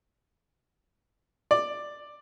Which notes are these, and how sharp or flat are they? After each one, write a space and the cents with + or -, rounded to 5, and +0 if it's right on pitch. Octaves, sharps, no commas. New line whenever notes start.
D5 +5